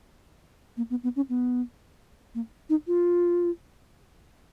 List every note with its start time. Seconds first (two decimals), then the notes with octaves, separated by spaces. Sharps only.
0.77 A#3
0.90 B3
1.03 B3
1.16 C#4
1.29 B3
2.35 A#3
2.69 D#4
2.87 F4